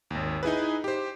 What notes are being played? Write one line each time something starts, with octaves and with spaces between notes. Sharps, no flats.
G#1 D#2
D#4 E4 G#4 B4
G4 C5